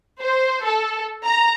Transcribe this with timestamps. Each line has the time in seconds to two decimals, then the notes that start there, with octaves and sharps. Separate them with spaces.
0.21 C5
0.65 A4
1.25 A#5